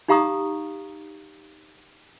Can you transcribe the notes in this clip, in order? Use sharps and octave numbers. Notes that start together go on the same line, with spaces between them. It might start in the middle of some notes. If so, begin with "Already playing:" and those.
D#4 G4 F5 A#5 C#6 D#6